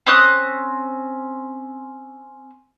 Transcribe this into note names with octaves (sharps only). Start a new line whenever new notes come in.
C4 C#4 D#6 F#6